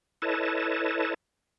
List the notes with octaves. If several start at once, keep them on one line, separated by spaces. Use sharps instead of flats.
E4 A4 B4 C#5 D#5 A5